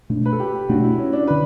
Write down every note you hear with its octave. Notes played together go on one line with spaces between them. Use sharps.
B2 A3 D4
B4
A4
G4
B2 A3 D4 F#4
E4
C#4
D4
D3 B4